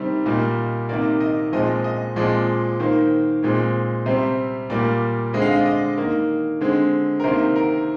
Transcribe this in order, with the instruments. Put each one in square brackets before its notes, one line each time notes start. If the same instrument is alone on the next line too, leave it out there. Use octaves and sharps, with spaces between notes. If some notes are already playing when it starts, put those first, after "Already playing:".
Already playing: [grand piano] C3 D#3 G3 C4
A#2 G3 A#3 D#5
C3 D#3 A#3 D5
D#5
A#2 F3 G#3 C4 D#5
D#5
A#2 F3 G#3 C4 D5
D#3 A#3 C5
A#2 G#3 C4
C3 G3 C4 C5
A#2 G3 A#3 D5
D3 G#3 C4 D#5
F5
D#5
D5
D#5
D#3 A#3
D3 G#3 C4
A#4
C3 D#3 A#3 C5
A#4